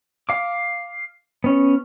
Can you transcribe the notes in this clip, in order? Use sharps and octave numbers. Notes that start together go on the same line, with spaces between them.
F5 D6
B3 C#4